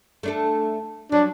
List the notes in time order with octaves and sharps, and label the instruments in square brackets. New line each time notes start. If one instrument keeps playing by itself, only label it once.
[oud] A3 D4 A4
[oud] F#3 [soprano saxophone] D4